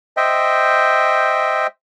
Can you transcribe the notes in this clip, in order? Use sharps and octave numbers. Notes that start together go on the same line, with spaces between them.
C5 D#5 E5 G5